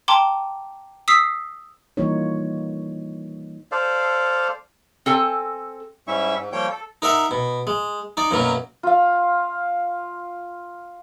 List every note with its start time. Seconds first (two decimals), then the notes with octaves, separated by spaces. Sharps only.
0.08 G5 A5 A#5 C6 D6
1.08 D#6 E6 B6 C7
1.97 E3 G3 A#3 D#4 F4 C#5
3.72 A4 C5 D5 F5
5.06 C4 A4 G#5
6.08 G#2 G3 C#4 E4 E5 C#6
6.39 G#2
6.52 F3 G3 A#3 C#5 G5 G6
6.71 A4
7.02 D#4 A#4 E5 F#5
7.31 B2
7.67 G#3
8.17 D#4 D5
8.31 F#2 B2 F#3 A#3
8.83 F4 F5